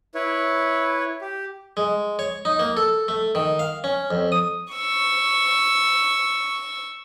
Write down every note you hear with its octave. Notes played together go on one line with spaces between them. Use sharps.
E4 B4 C#5
G4
G#3
C#5
D#4
A#3
A4
A3
D#3
F5
C#4
F2
D#6
C#6 E6